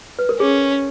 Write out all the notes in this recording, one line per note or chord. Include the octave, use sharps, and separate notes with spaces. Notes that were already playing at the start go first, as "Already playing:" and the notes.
B4
A#4
C#4 G#4